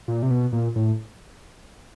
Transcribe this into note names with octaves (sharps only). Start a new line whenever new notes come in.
A#2
C3
B2
A#2
A2